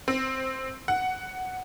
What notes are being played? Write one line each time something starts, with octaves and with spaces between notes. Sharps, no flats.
C4
F#5